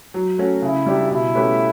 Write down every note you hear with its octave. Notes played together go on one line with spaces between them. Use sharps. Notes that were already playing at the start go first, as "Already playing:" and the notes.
F#3
A3 C#4 F#4
C#3 E4
G3 D4 G4
B2 E4
A3 C#4 G4 B4